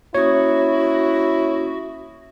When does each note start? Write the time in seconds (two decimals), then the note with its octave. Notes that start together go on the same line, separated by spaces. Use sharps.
0.14 A#3 C#4 E4 F#4 C#5 D#6